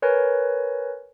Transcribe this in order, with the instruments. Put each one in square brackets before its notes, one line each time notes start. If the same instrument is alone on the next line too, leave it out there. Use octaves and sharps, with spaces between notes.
[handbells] A#4 B4 C#5 G#5 A#6